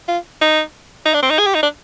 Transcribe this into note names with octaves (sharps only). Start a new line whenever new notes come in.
F4
D#4
D#4
D4
C4
D#4
G#4
G4
D#4
D4